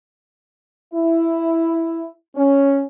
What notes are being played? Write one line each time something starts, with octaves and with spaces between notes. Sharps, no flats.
E4
C#4